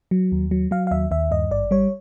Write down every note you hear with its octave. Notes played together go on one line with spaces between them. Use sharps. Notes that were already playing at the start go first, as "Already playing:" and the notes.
F#3
D#2
F#3
F#3 F5
F5
D#2 E5
D#2 E5
G2 D#5
G#1 D5
G3 C#5